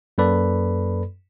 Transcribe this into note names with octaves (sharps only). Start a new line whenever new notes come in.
F#2 A#3 A4 B4 D5 B5